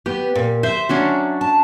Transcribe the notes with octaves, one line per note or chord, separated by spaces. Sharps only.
B3 G4
A#2
C5 E5
F#3 C#4 D4
A5